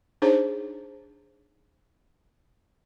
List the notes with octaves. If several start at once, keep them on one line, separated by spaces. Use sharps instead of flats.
D4 D#4 G#4 C5 C#5